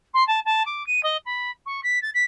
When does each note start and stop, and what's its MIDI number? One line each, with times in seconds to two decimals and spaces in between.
0.13 0.25 84
0.27 0.39 81
0.45 0.63 81
0.65 0.85 86
0.86 1.02 99
1.03 1.17 75
1.25 1.50 83
1.66 1.81 85
1.83 2.01 95
2.02 2.10 93
2.14 2.24 95